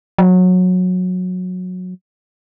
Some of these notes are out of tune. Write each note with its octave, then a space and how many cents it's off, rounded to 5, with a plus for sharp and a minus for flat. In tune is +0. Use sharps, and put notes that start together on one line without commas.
F#3 -20